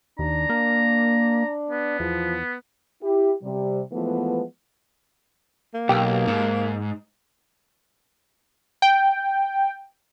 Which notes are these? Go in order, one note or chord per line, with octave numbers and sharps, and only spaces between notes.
D#2 D4 A#5
A#3
B3
E2 F3
E4 G4
C3 G3
E3 F3 G#3 A3 B3
A#3
B1 G4
G#2
G5